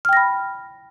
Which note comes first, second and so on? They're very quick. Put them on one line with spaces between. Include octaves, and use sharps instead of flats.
F6 G5 A#6 B5